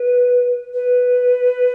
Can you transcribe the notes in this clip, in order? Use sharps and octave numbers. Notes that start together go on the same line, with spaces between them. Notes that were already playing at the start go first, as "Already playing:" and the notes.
Already playing: B4
B4